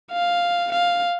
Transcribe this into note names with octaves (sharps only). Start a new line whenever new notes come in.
F5
F5